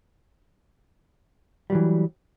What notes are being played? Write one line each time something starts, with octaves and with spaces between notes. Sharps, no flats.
E3 F#3 G3